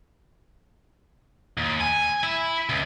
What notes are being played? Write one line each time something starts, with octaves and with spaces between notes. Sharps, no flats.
D#2
G#5
E4
C#2